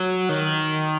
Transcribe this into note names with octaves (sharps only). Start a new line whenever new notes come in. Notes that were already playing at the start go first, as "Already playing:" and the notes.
Already playing: F#3
D#3